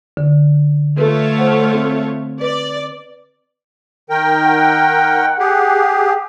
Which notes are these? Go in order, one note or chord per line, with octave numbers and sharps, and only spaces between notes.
D3
A3 F4 B4 C#5
C5 F#5
C4
B4 D5
D#3 A#4 G5
F#5
G4 G#4